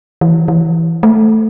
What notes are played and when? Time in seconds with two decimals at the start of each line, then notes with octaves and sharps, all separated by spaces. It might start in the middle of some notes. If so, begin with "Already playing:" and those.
0.21 E3
0.48 E3
1.03 A3